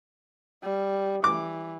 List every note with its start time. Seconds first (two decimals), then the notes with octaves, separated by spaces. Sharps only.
0.63 G3
1.24 E3 D6